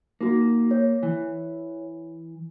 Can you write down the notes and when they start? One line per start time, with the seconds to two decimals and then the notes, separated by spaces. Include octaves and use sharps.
0.21 A#3 D#4 F#4
0.71 C#5
1.03 E3